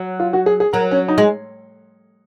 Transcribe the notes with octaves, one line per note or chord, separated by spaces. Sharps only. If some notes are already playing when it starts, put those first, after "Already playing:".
Already playing: F#3
F4
F#4
G#4
G#4
F#3 A#4
C#4
D#4
G#3